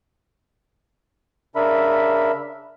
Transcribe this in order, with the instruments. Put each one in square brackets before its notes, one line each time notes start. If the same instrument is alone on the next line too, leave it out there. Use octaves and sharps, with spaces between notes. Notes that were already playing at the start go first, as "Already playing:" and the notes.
[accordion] C#3 D4 A#4 E5 B5